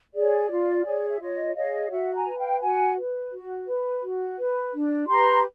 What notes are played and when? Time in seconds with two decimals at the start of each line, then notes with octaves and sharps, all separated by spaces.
0.15 G#4 C#5 D5
0.50 F4
0.85 G#4 C#5
1.09 E5
1.20 F4 C#5 D#5
1.55 G#4 C#5 D#5 F5
1.91 F#4 E5 F#5
2.14 G#5 A#5
2.26 B4
2.38 F5 G5
2.61 F#4 F#5 G#5
2.97 B4
3.31 F#4
3.67 B4
4.02 F#4
4.38 B4
4.74 D4
5.08 G4 B4 A#5 C6